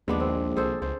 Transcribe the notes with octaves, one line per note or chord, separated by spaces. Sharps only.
A#1 D#2 G#3 B3 D4
C4
C2 G#4 A4 C5
C#2 C5